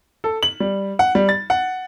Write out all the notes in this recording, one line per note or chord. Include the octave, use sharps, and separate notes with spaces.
A4
F#7
G3
F#5
G3
A6
F#5